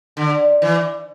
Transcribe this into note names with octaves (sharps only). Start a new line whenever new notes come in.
D3
E3